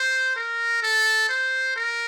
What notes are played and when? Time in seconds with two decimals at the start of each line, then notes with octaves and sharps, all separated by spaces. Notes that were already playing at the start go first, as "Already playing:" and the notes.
Already playing: C5
0.36 A#4
0.83 A4
1.29 C5
1.76 A#4